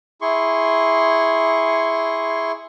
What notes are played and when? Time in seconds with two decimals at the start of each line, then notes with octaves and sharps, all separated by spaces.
0.21 E4 G#4 C6 C#6